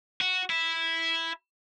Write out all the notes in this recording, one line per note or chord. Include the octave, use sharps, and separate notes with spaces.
F#4
E4